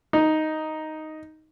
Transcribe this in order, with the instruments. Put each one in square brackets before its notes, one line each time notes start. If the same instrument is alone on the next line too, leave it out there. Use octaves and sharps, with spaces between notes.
[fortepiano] D#4